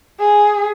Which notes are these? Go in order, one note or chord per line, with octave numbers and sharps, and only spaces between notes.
G#4